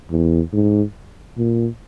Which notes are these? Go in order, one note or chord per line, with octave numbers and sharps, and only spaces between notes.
E2
G#2
A#2